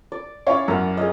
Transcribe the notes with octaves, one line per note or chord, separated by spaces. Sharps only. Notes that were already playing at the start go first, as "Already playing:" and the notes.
D5
C#4 E4 C#5 D5 F5 C#6
F#2 A#4 F#5
G#4 C#5 D#5